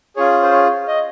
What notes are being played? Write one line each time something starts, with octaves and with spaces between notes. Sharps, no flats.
C#4 F4 G#4 C#5
C5
C#5
D#5